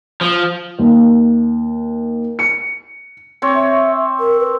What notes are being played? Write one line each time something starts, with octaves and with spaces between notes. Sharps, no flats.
F3
D#2
C#7
C4 C#5
E5
A#4
B4